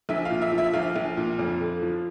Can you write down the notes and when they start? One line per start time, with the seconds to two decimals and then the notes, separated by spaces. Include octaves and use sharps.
0.09 A#1 E5
0.25 F5
0.30 A#2
0.42 E5
0.52 F3
0.58 E5
0.74 A#1 F5
0.96 A#1
1.17 A#2
1.39 F2
1.60 D3
1.82 F3